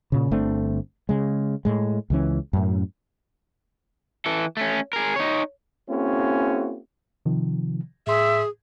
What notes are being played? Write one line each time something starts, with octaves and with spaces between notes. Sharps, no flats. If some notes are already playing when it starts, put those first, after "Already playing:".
A#2 C#3
G1 A3 C4 D4
C#3 G#3
A2 G#3
C#2 E3 C#4
F#2 A2
E3 A4
A3 C#4
G#4 A#4
D#4 C#5
A#3 C4 C#4 E4 F#4 G#4
C3 D#3 F3
A2 G#4 E5 C6